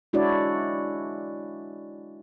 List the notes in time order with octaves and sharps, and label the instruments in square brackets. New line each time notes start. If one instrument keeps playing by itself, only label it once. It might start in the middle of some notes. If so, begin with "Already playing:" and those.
[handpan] G#3 D4 E4 F#4 C#5 D5